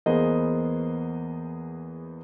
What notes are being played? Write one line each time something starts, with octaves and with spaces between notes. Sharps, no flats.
E2 A#3 B3 G#4 C5 D#5